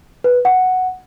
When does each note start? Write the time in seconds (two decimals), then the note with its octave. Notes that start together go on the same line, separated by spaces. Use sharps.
0.24 B4
0.45 F#5